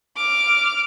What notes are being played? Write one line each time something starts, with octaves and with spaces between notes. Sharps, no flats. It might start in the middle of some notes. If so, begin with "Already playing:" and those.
D6 F6